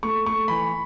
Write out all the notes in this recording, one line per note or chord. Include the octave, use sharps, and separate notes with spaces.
A3 C#6
A3 C#6
E3 B5